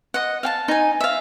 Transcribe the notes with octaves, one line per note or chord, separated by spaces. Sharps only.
D#5 F#5
F5 G5 A5
D#4 G#5
E5 F5